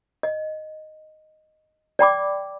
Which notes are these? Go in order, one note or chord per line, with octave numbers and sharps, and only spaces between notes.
D#5
D5 G5 B5 D6